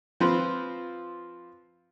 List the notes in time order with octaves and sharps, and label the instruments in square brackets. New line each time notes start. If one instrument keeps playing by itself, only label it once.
[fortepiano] F3 C4 B4